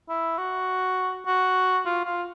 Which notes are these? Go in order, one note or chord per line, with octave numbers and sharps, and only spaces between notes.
E4
F#4
F#4
F4
F4